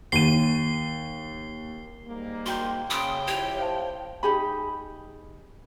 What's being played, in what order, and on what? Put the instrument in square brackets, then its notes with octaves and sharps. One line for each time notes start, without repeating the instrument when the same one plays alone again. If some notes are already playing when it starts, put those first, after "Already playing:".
[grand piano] D#2 D#7 [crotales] C7 G7
[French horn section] G#2 G3 A#3
[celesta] F#4 G5 G6 [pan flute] C6
[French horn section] C#3 [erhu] G5 [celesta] B5 C6 D7 [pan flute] D#6
[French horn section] F2 E4 G4 [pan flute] C#5
[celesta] C5 F5 A5
[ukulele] D#4 G4 G#4 B5